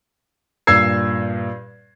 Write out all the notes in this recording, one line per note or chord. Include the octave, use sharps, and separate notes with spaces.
G2 A#2 E6 G#6 C7